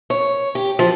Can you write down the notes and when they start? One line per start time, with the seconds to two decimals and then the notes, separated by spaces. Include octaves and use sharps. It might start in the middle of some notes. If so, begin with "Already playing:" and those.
0.10 C#5
0.55 G4
0.79 F3